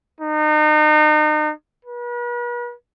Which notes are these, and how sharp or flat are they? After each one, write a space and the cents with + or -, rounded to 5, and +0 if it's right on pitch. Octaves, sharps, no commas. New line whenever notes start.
D#4 -35
B4 -40